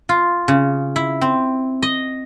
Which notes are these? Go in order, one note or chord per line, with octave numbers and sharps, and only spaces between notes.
F4
C#3
E4
C4
D#5